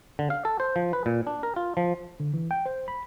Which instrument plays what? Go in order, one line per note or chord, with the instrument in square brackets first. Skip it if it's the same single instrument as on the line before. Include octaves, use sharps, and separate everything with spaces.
[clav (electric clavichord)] D3
F5
A4
C5
F3
B4
A#2
D4
A#4
F4
F3
[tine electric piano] D3
E3
G5
C5
B5